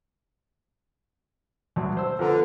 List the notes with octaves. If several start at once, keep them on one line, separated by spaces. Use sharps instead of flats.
D2 G2 F#3
C5 E6
D3 F3 B3 A#4